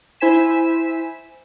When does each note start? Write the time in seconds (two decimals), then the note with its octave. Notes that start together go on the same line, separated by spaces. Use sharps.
0.20 E4 C5 G#5 B6 E7